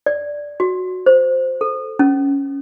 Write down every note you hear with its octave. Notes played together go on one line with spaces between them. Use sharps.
D5
F#4
C5
A4
C#4